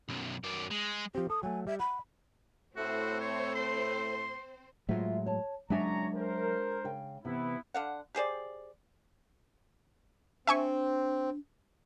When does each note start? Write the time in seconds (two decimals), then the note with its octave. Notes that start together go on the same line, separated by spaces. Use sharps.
0.09 B1 F#2
0.44 F#2 D5
0.71 G#3
1.15 F3 C4 G4
1.30 A4 D#6
1.43 F#3 A3 G#5
1.67 G3 E5
1.80 F#5 B5
2.76 A2 A3 C4 F#4 C5
3.20 C#5
3.55 C6
4.89 A2 F#3 G#3 F4 C5 E5
5.26 C#5 A5
5.70 F#1 F#3 G#3 D4 C#5 E5 G#5 A#5
6.14 A#4 C5
6.84 C#3 G5
7.25 C3 E3 B3 E4
7.74 D3 F5 F#5
8.15 G4 G#4 C5 D5
10.47 C4 D4 E5 G#5 C#6